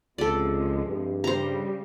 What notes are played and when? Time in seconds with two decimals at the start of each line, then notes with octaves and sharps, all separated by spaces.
0.18 C#2 C3 F3 G#3 A4 D5
0.85 G2
1.24 C#3 G3 C5 A#5